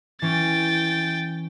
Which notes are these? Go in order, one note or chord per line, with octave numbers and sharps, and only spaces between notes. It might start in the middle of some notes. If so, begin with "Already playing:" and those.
E3 C#4 G5 A6